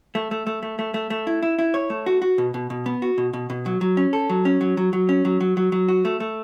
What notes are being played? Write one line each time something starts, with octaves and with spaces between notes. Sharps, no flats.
A3
A3
A3
A3
A3
A3
A3
E4
E4
E4
C#5
A3
F#4
F#4
B2
B2
B2
B3
F#4
B2
B2
B2
F#3
F#3
C#4
A4
F#3
C#4
F#3
F#3
F#3
C#4
F#3
F#3
F#3
F#3
F#4
A3
A3